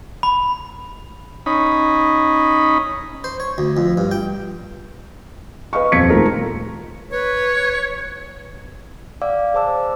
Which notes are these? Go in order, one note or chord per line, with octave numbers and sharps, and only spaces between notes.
B5
C#4 D#4 B5
C5
C#5
D2
F2
G2
G5
B4 D#5 F5 C#6
D#1 F2 G#6 B6 C#7
D#3 G#3 A3 F4 A#4
B4 C#5
D5 F5 F#5 D6 E6
G#4 C5 A5 D6 E6